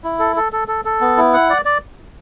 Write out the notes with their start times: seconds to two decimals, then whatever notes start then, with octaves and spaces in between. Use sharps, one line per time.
0.04 E4
0.19 A4
0.36 A4
0.52 A4
0.68 A4
0.85 A4
1.01 B3
1.17 E4
1.33 F#5
1.50 D5
1.65 D5